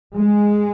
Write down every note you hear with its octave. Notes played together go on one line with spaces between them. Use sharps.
G#3